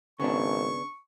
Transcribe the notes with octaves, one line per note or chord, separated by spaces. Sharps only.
G#1 C#3 B3 D4 C#6